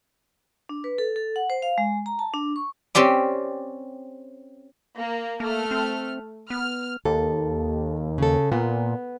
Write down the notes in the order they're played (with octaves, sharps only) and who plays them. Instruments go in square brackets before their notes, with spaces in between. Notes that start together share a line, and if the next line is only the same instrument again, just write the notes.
[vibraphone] D4
B4
A4
A4
F#5
C5
F5
G#3
A#5
A5
D4
C#6
[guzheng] C4 C#4 G4 D5
[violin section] A#3
[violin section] A3 F6 [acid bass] A#3
[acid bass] C4
[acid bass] B3 [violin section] F6
[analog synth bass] D#2 [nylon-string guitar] A4
[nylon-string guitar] C#3 A4
[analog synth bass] A#2 [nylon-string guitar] B3